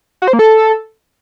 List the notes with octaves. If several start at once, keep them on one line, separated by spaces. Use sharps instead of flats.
F#4
C5
A#3
A4